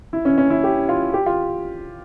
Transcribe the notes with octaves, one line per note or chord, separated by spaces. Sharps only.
E4
C#4
C#4
E4
G4
F4
G4
F4